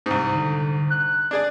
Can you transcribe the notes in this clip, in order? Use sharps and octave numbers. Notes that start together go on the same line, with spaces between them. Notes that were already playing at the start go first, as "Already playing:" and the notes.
C2 G#2
D3
F#6
D4 G#4 D5